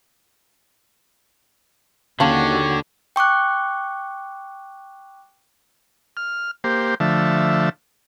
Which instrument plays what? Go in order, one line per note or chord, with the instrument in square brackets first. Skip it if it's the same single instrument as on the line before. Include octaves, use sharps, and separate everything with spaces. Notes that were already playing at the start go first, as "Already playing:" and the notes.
[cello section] D#2 F#4 [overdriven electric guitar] D3 [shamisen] C#4 F5 A5 [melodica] G4 C#5
[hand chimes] G5 C#6 D6 F#6
[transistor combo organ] F6
A#3 G4 C5
D3 F3 A3 E5